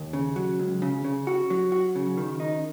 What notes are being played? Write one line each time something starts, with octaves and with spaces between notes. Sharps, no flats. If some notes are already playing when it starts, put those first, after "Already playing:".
Already playing: D#2
C#3
F#3
C#2
C#3
C#3
F#4
F#3
F#4
C#3
D#3
D#4